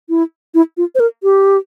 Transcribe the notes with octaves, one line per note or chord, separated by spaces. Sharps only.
E4
E4
F4
C5
A#4
G4